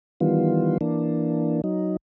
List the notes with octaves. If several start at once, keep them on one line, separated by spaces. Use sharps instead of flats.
D#3 E3 G3 B3 F4
E3 A#3 D4
F#3 D#4